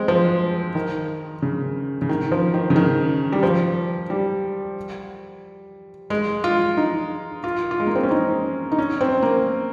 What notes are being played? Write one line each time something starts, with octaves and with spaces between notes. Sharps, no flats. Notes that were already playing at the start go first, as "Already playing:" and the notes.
Already playing: G#3 C4
F3
D#3
C#3
C#3
D#3
F3
D#3
C#3
D#3
G3
F3
G3
G#3
F4
D#4
F4
F4
G#3
A#3
C4
C#4
D#4
D#4
C#4
C4
A#3